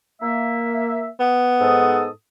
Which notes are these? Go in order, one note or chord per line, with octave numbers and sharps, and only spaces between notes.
A#3 E5
B3
G#2 A4 D#6